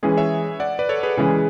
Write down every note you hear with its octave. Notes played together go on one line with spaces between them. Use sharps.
E3 G#3 C#4 G#4 B4
C#5 E5
D5 F#5
B4 D5
A4 C#5
G#4 B4
C#3 E3 G#3